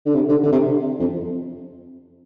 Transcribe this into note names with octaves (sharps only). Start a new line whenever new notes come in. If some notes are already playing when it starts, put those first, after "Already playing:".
D3
C3
D3
D3
C3
F2